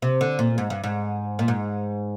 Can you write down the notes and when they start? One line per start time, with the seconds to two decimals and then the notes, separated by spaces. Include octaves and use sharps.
0.02 C3
0.21 D3
0.39 A#2
0.58 G#2
0.70 G2
0.84 G#2
1.39 A#2
1.48 G#2